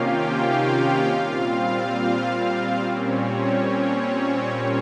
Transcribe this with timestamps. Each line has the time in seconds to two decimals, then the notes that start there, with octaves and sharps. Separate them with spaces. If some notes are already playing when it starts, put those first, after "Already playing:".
Already playing: C3 D#3 A#3 C#4 F4 G4 F5 G5
0.20 F4 F5
0.64 F4 F5
1.08 A#2 G3 C4
2.82 A#2 G3 C4 C#4 C#5